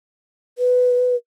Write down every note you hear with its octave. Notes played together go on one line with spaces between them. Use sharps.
B4